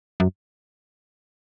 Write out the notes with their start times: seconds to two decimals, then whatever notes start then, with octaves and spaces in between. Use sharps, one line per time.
0.20 F#2